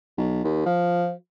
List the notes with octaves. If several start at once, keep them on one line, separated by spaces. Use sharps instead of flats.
B1
D#2
F3